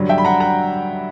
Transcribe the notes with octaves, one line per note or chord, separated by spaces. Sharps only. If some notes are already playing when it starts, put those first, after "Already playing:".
Already playing: G2 D3 F#3
E5 G5
B5
F#5 A#5
F#5 A#5